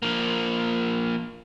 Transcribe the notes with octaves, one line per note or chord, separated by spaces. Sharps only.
F3 A#3